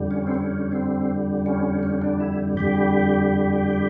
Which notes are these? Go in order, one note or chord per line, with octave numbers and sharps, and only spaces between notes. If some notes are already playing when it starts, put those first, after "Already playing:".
Already playing: F2 D3 G3
C#4
C4
C#4
C4
C#4
C#4
D4
E4
F2 D3 G3 G4